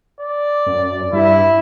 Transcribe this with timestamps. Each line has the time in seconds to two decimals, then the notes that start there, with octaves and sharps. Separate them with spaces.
0.20 D5
0.66 F#2
1.13 G2 E4